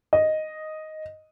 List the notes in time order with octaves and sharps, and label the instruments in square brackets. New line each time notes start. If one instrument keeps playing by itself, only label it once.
[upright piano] D#5